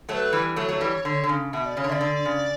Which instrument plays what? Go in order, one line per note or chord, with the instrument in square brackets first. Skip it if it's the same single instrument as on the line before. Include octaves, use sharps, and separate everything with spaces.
[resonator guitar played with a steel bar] F#3 A3 [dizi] B4 C#5
[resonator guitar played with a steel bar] E3 G3
[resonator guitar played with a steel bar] F#3 A3 [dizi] C#5
[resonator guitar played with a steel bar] F#3 A3
E3 G3
D3
D3
C#3
[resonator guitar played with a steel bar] B2 [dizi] E5
[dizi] D5
[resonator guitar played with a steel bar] C#3 [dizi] C#5
[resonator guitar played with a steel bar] D3
[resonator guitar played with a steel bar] C#3 [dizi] D5 E5
[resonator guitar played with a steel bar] D3
C#3